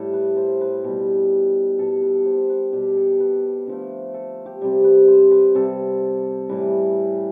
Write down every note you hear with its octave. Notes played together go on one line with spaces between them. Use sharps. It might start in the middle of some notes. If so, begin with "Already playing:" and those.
Already playing: A2 G3 A4
B4
C5
B4
B2 G3 G4
B2 G3 A4
B4
C5
B4
B2 G3 G4
A4
B4
D3 F3 A3
A4
G4
C3 G3
B4
C5
B4
C3 G3 A4
A2 E3 G3 B4